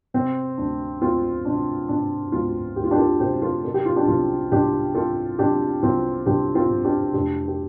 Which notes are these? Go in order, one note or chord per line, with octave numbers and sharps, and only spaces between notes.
C3 C4
D2 D4
D2 C4 F4
C3 D4
C3 D4
D2 C4 F4
D2 G4
F4
D4 G4
F4 A4
C3 G4 C5
F4 A4
C3 A4
G4
F4
D4 G4
C2 C4 F4
C2 D4 G4
C3 F4 A4
C3 D4 G4
C2 C4 F4
C2 D4 G4
C4 F4
C3
D4 G4
F1 D4 G4
G4